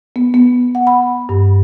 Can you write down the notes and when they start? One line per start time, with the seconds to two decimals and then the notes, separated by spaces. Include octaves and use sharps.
0.16 B3
0.34 B3
0.75 F#5
0.87 B5
1.29 G2